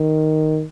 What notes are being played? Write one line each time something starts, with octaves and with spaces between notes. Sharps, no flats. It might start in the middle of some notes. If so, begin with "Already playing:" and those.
Already playing: D#3